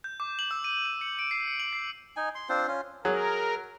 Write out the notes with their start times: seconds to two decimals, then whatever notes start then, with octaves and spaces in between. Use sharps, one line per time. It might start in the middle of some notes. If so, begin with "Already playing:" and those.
0.04 G6
0.20 D6
0.39 F#7
0.51 E6
0.64 D#7
0.85 D#7
1.01 C#7
1.19 D7
1.31 C7
1.47 C#7
1.60 F#7
1.73 C7
2.16 D#4 G#5
2.35 C6
2.49 C4 D4 F4 C5
2.68 C#4 F4
3.05 F#3 G#4 A#4